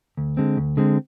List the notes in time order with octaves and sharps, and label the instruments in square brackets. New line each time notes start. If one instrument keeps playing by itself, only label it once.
[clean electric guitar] D2
D3 G#3 C4
D2
D3 G#3 C4